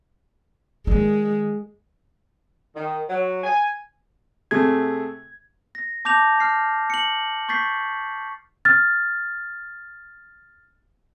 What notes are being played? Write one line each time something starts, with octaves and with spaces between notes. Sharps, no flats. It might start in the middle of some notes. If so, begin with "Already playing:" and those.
D#3 G#3 D4
D#3
F#3
G#5
C3 A3 G#4 G#6
A#6
A5 D6 G6 A#6 F7
F6 C7
C#7 F#7
C#6 G6 A6 B6 C7
F6 A6